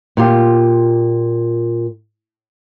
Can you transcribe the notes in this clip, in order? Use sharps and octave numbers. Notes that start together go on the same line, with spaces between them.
A#2 F4 G4